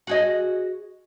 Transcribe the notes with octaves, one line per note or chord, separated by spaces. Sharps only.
F#4 G#4 D#5